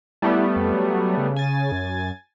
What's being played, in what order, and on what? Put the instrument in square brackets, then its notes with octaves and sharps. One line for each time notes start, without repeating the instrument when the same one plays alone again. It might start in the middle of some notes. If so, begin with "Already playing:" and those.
[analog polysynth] G3 A3 B3 [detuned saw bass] E4
[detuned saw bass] F2
F#3
C#3
[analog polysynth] G#5 A6
[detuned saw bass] F#2